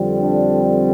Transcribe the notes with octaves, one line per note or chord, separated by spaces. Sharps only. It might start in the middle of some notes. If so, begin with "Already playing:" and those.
Already playing: F2 D3 G3 C4
D4